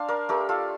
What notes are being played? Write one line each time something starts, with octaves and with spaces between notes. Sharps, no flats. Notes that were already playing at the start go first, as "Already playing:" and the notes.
Already playing: D4 C5 F5
A#4 D5
A3 G4 A#4
F4 A4